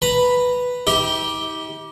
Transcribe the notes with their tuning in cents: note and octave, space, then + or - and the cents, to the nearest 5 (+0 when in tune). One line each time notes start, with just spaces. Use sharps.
B4 +0 A#5 -15
D#4 +45 G4 +0